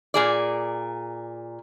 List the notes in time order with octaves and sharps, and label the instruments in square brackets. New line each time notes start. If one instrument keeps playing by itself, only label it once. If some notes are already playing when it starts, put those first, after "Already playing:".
[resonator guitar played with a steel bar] A#2 G#4 D5